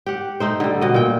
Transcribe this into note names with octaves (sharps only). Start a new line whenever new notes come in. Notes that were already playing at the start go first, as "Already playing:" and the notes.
G4 F#5
A3 D#4 C5
D3 G3
B2 D#5
A#2 G5